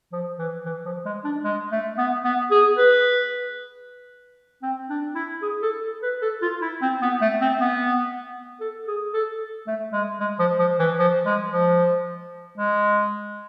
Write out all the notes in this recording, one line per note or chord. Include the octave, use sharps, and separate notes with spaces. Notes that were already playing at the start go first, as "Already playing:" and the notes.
F3
E3
E3
F3
G#3
D4
G#3
A3
B3
B3
G#4
B4
C4
D4
E4
G#4
A4
B4
A4
F4
E4
C4
B3
A3
C4
B3
A4
G#4
A4
A3
G#3
G#3
F3
F3
E3
F3
G#3
F3
G#3